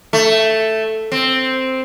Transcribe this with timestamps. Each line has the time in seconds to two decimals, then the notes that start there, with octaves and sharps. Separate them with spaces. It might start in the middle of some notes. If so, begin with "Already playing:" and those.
0.13 A3
1.12 C4